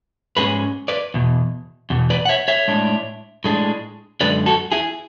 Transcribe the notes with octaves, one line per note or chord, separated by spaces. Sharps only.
G#2 G#3 C#4 G#4 B4
B4 D5
E2 B2
E2 B2
B4 D5
F#5
C#5 E5
C#5 E5
A2 G#3 D4
A2 G#3 D4
F#2 D3 G#3 B4 D5
F#4 A4
E4 G#4